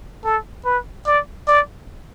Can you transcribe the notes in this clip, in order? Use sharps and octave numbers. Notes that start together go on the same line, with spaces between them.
A4
B4
D5
D5